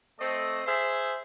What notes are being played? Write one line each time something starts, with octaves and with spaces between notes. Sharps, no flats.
A3 C4 D#5
G#4 C5 E5